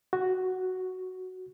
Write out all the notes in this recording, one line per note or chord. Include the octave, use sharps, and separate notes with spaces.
F#4